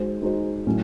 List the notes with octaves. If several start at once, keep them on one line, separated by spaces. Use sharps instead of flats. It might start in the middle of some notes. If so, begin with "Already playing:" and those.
Already playing: G#3 D#4 F#4 C5
G#3 D#4 F#4 C5
A2 F#3 C#4